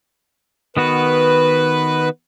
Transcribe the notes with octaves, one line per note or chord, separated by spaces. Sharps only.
D#3 B3 F#4 B4